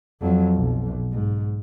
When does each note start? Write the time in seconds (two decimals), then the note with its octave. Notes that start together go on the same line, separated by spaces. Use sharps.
0.21 F2 F#3
0.55 B1
1.12 G#2